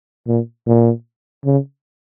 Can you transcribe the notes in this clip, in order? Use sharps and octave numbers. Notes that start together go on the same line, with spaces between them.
A#2
A#2
C#3